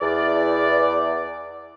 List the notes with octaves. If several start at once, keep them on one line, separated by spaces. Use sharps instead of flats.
E2 D5